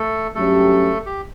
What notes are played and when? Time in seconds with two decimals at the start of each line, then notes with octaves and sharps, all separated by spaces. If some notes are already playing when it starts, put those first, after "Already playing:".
Already playing: A3 A4
0.35 G2 F#3 A3 C#4 G4 A4
1.06 G4